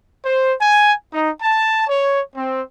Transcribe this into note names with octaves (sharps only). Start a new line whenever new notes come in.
C5
G#5
D#4
A5
C#5
C4